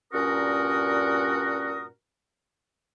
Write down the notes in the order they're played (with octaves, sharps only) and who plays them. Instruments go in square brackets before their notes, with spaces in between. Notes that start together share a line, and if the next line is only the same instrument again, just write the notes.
[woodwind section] G2 A#2 C#4 F#4 A#4 D#6